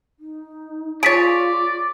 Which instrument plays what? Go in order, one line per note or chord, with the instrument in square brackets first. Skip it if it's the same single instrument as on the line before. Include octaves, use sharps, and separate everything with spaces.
[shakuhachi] D#4
[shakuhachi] F4 [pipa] G#4 C#5 [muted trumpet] D5 [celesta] A6 B6 D7